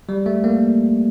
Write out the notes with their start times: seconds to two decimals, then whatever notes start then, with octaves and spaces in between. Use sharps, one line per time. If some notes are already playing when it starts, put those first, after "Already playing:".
0.09 G3
0.26 A3
0.44 A#3